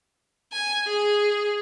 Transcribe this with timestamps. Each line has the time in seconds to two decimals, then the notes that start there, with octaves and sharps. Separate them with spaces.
0.52 G#5
0.87 G#4